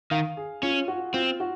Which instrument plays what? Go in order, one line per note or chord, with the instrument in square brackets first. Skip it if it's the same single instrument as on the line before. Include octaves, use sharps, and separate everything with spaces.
[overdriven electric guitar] D#3 [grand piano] F5
[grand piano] G#4
[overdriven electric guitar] C#4 [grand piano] F4
[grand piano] F#4
[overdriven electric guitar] C4 [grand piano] F4
[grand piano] F#4